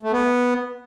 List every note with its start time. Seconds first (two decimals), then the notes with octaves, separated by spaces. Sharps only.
0.03 A3
0.12 B3